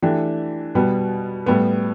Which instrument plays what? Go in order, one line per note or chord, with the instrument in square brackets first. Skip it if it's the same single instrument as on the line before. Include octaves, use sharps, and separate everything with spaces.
[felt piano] E3 A3 D4 G4
B2 G3 B3
A2 G3 B3